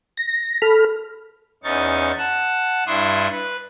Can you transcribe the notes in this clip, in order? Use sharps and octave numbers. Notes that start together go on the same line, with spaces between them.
A#6
A4 B5 F6
E2 C#4 D#4 C#6 A6
F#5 A5
G2 D4 E4 C6 C#6 D#6
B4